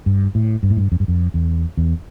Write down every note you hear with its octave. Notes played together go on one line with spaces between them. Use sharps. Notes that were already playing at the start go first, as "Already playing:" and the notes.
G2
A2
G2
A2
G2
F2
G2
F2
E2
E2